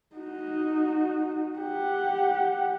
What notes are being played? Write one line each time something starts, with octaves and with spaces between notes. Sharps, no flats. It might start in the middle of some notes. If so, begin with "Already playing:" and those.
D#4 F#4
G4 F#5